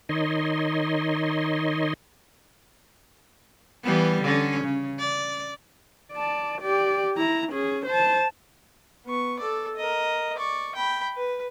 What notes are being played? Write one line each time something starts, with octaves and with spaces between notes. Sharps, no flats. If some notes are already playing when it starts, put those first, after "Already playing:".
D#3 D#4 C#5 D#5 C6
E3 G3 B3
D3 C#4
C#3
D5
D5 A5
G4 D5
E4 A#5
C#4 G#4
C5 A5
B3 C#6
A4 D5
A#4 D#5
D5 C#6
G5 B5
B4